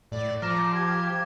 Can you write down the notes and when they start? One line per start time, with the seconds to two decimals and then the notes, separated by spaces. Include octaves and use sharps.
0.12 A2 D5
0.42 F3 A#5 D6 F6 A#6 E7
0.74 G4 G#6